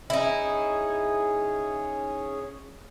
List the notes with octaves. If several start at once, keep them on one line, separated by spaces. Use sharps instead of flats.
C#4 D#4 E4 G#4 C#5